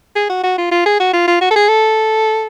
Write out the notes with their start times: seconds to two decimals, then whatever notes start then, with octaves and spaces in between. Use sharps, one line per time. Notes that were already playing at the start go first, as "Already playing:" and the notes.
0.16 G#4
0.30 F#4
0.43 F#4
0.58 F4
0.71 F4
0.86 G#4
1.00 F#4
1.13 F4
1.28 F4
1.41 F#4
1.51 A4
1.56 G#4
1.69 A4